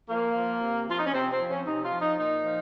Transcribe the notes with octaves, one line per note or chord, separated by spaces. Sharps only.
F3 A#3
F3
C3
F3 F4
D#4
C#4
C3 C4
C4
F3
C#4
C3 D#4
F4
F3
D#4
A#2 D#4
F3